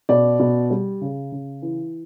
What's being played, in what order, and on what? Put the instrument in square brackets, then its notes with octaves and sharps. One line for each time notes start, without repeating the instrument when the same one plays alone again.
[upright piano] B2 D5
B2
G3
C#3
C#3
E3